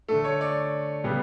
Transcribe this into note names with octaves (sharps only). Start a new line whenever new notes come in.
D3 A3 A4
C#5
D5
C#3 G3 B3